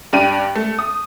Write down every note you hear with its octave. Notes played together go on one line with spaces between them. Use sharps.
G2 D4 G5 D#7
A3
D#6